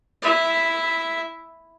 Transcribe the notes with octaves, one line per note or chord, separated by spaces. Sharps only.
E4 E5